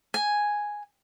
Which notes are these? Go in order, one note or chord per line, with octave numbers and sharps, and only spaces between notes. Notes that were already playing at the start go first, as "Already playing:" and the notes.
G#5